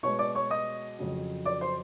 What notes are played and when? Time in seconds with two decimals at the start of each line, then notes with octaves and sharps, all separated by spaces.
0.03 B2 G#3 C#5 C#6
0.19 D5 D6
0.35 C#5 C#6
0.50 D#5 D#6
0.99 F2 C#3 F#3
1.46 D5 D6
1.61 C5 C6